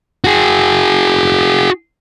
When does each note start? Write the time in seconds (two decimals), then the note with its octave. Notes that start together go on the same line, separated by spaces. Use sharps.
0.24 F#4 G#4